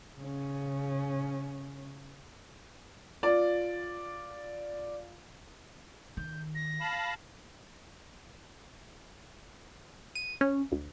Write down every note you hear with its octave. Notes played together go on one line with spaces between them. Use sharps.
C#3 C#4
F4 D5
D#3 G6
A#6
F5 A5 B5
D#7
C#4
D2